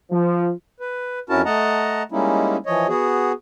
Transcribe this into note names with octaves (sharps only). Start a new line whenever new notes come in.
F3
B4
F2 C#4 E4 F#4 A#4 A5
A3 D#5 F#5 A5 A#5
G3 G#3 A#3 C#4 D#4 E4
E3 F3 C#5 D#5
B3 F#4 G#4